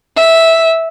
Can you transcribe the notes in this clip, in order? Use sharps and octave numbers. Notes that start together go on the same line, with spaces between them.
E5